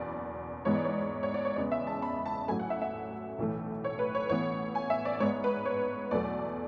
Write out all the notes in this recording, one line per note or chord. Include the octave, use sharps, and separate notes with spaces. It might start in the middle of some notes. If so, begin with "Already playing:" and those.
Already playing: F#1 E2 B2 D5
G#2 E3 G#3 B3 C#5
D5
C#5
C#5
D5
C#5
E2 C#3 G#3 B3 D5
E5
A5
B5
A5
A1 A2 F#3 A3 G#5
F#5
E5
E5
B1 A2 E3 A3
C#5
B4
C#5
A1 A2 E3 B3 C#5
G#5
E5
D5
G#2 G#3 B3 C#5
B4
C#5
E2 B2 F#3 A3 D5